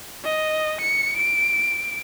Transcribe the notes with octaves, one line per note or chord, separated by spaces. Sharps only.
D#5
C#7
D7